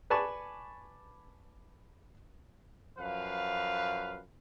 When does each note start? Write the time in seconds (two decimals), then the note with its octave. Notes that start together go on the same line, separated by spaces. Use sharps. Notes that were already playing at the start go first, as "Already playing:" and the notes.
0.10 B4 D5 G#5 A5 B5 C#6
2.98 F#2 F3 B4 F5